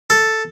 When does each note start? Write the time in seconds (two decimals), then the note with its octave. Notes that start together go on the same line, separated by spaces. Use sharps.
0.10 A4